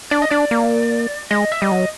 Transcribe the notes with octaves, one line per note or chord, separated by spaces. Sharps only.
D4 D5
D#5
D4 D5
A#3
G#3 D#5
E5
G3 D#5
F#3